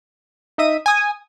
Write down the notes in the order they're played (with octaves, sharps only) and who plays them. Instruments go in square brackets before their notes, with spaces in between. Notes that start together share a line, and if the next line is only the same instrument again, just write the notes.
[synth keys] D#4 D#5 E5 D#6 D#7
G#5 D#6